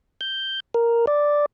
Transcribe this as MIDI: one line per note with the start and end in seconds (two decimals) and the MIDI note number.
0.21 0.60 91
0.74 1.06 70
1.07 1.46 74